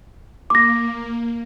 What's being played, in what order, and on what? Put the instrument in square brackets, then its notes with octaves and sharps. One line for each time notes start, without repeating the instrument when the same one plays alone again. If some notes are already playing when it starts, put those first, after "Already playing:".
[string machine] A#3 [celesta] D6 A#6